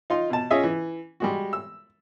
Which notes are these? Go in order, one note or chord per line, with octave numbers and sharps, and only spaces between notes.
D#4 F4 C6
B2 A5
C#4 F4 G#4 D#5 E5
E3
G3 G#3 F#4
E6